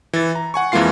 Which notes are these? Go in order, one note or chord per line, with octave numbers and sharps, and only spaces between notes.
E3 A6
A#5
F#5 G#5 C#6
F2 E3 G#3 A#3 F4 C7